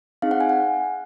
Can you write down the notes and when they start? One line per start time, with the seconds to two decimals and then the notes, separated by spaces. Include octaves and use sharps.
0.22 C4 D#4 G#4 F5
0.31 F#5
0.41 G#5
0.49 F#5